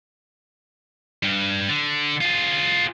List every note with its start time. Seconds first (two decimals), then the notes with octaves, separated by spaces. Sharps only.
1.23 G2
1.69 D3
2.21 F4 G#4